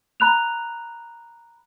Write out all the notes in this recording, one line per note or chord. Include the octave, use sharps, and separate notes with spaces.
A#5 B5 F#6 F7